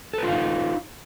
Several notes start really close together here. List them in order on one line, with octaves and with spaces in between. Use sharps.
A4 B4 F4 F5 D#4